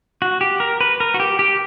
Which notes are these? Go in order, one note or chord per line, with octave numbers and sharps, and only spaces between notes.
F#4
G4
A#4
B4
A#4
F#4
G4
G4